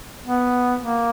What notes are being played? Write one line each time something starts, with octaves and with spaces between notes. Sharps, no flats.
B3
A#3